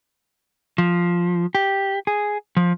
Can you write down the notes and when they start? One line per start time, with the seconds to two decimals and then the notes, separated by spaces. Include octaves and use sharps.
0.78 F3
1.55 G4
2.07 G#4
2.57 F3